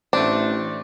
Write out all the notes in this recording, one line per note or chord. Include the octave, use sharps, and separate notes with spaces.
A1 A3 C4 D4